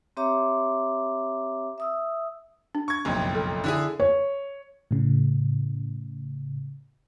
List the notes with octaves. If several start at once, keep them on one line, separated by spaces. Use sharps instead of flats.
C4 G4 C#5 E5 A#5 D6
E5 D#6 E6
D4
C#6 G#6
F#1 B1 F2
A4
D3 E4 G#4
C#5
A2 C#3